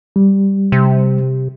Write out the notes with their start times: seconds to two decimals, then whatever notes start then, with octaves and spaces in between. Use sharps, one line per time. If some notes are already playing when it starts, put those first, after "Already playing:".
0.16 G3
0.72 C3